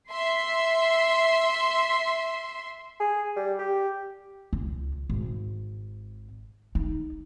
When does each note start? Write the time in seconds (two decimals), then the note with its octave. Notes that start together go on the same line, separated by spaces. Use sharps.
0.10 E5 C6
3.00 G#4
3.36 G3
3.59 G4
4.53 C#2
5.09 G#1
6.75 D#4